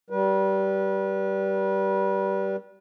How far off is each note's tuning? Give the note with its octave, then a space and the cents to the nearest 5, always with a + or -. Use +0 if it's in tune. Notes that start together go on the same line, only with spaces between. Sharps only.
G3 -20 B4 -30